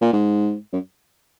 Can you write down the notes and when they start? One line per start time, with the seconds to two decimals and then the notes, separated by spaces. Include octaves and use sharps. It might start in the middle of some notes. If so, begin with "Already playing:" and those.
0.01 A#2
0.13 G#2
0.73 F#2